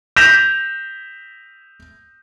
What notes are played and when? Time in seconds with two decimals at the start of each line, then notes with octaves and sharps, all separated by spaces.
0.16 G6 A#6 B6 E7 F7